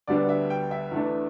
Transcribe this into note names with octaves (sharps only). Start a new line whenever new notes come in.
D2 D3 G3 B3 D4 D5
E5
G5
E5
E2 E3 A3 D4